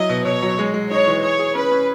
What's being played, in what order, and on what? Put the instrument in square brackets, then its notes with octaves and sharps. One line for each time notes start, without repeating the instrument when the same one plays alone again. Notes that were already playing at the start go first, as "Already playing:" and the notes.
Already playing: [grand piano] F#3 E4 [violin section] D#5
[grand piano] B2
[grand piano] B2 [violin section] C#5
[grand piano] F#3
G#3
G#3
[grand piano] D#4 [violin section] C#5
[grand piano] E3
[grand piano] G#4 [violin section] C#5
[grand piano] G#4
[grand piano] C#4 [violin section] B4
[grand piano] C#4